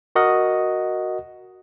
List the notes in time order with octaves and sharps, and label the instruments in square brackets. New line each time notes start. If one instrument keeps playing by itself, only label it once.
[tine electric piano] F#4 A#4 D#5 F#5